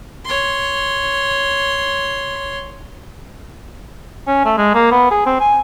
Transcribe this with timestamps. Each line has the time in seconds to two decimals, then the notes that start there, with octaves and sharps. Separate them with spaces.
0.25 C#5 C6
4.27 C#4
4.45 A3
4.58 G#3
4.74 A#3
4.91 B3
5.11 G#4
5.26 C4
5.40 G#5